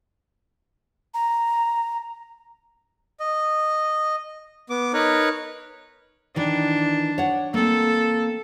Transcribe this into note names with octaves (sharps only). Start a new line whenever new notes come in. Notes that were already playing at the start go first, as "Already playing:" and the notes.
A#5
D#5
B3 D6
D#4 A#4 B4 C#5
D#3 E3 D4
C#5 F#5
A#3 C4 A4